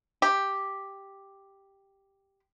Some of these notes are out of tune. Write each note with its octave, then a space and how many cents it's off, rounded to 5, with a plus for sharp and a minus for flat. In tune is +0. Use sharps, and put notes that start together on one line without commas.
G4 +0